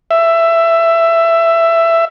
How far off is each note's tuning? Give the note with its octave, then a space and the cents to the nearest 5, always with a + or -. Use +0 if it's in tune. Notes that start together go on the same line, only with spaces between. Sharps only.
E5 +15